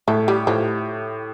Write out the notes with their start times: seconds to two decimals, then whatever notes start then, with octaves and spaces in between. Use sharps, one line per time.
0.08 A2 A3
0.28 G3 G4
0.47 A2 F3